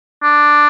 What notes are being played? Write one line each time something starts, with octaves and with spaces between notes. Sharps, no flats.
D4